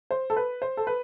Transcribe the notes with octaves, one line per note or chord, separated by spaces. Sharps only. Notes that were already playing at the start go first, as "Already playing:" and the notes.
C5
A4
B4
C5
A4
B4